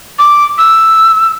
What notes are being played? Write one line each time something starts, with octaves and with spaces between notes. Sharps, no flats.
D6
E6